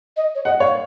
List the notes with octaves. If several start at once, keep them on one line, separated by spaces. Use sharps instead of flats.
D#5
C#5
D#5 F#5
C#5 F5